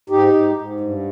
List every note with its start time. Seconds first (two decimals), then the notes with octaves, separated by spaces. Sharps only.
0.10 G#2 D#4 G4
0.33 G#2
0.56 G#2
0.80 G2